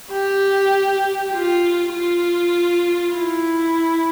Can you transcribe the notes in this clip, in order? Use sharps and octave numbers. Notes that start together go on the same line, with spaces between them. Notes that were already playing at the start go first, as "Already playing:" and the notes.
G4
F4
F4
E4